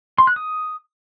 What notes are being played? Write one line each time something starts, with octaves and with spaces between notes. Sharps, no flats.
C6
F#6
D#6